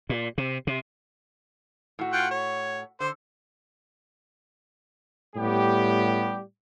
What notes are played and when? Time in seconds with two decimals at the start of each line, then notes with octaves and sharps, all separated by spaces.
0.09 A#2
0.38 C3
0.67 C3
1.99 A2 F#4
2.13 F4 F#5 G5
2.31 C#5
3.00 D3 C5
5.36 A2 G3 B3 G4